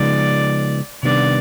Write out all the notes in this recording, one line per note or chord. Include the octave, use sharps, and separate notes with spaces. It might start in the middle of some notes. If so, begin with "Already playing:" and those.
Already playing: C#3 F3 G#3 B3 D#4 D5
C3 D#3 G3 B3 D4 D5